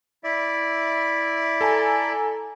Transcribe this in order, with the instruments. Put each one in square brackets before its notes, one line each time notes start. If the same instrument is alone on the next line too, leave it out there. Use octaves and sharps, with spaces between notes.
[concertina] E4 D5 E5
[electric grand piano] A4 G#5 A#5